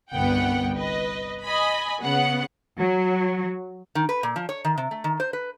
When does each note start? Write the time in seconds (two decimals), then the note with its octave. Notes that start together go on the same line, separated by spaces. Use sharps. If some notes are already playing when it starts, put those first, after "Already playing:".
0.11 G1 C2 B3 F#5 G5
0.76 B4 D#5
1.44 D#5 G#5 B5
2.01 C#3 B3 F#5
2.79 F#3
3.95 D#3
4.09 B4
4.23 A#2
4.36 F3
4.49 C#5
4.65 D#3
4.78 C3
4.91 A3
5.04 D#3
5.20 C5
5.33 B4